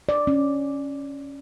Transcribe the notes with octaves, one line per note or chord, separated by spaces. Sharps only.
D5
C#4